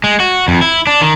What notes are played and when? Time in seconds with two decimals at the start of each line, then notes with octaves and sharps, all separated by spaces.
0.04 G#3
0.20 F#4
0.48 F2
0.62 E4
0.87 D4
1.01 D#3